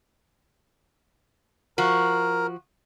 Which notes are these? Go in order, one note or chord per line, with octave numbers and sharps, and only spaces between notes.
F3 F#4 A#4